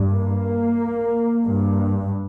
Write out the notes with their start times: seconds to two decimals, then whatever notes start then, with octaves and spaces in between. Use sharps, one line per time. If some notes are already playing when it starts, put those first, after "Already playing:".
Already playing: G2
0.10 A#3
1.46 G2